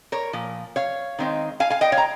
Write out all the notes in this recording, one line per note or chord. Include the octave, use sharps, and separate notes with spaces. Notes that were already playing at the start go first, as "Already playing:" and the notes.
A#4 C#5
A#2 F3
C#5 F5
D#3 G#3 C4 D#4
F5 G#5
F5 G#5
D#5 G5
C#5 F5
A#5